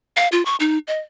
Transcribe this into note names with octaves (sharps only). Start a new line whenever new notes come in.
F5
F4
C#6
D#4
D#5